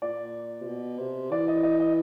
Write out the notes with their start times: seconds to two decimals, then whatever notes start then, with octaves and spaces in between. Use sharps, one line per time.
0.02 A#2 D5
0.61 C3
0.67 B2
0.99 C3
1.31 E3 D5
1.48 D#5
1.63 D#5
1.80 D#5